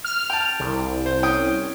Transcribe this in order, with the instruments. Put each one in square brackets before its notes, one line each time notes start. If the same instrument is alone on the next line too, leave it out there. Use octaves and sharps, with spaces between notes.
[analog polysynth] F6
[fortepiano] G5 A5
[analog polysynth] C2
[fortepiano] C5
C#4 G5 D#6